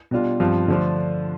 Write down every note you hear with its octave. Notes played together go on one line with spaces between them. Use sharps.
B2 G3 D4 F4
G2 F3 C4 F4
D3 F3 A3 D4 F4